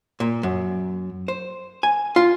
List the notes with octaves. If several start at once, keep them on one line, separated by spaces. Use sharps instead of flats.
A#2
F#2
C5
G#5
F4